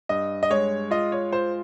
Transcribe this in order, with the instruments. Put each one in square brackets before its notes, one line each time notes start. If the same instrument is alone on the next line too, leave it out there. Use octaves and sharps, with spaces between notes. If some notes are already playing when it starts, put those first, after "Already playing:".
[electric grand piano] G2 [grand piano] D#5
[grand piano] D#5
[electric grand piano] G#3 [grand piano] C#5
[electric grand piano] F4 [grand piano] D#5
[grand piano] C#5
[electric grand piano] F4 [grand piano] C5